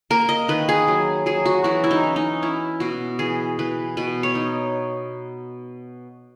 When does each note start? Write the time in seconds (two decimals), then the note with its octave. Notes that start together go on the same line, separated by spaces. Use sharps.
0.10 A#3 A#4
0.29 D#5
0.48 D#3 B4
0.69 G#4
0.88 F#3
1.26 F#3 G#4
1.46 F#4
1.64 E3 F#4
1.84 E4
1.91 D#4
2.03 C#4
2.16 D#4
2.42 C#4 E4
2.80 B2 F#4
3.19 E3 G#4
3.59 E3 B4
3.97 B2 B4
4.23 C#5
4.35 D#4